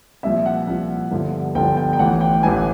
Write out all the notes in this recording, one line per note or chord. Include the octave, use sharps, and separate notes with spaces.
C2 A#2 F3 E5
F#5
C2 A#2 F3
G1 G2 D3 F3
G1 G2 D3 F3 G5
G5
G5
A1 A2 E3 F#5
G5
A1 A2 E3 G#5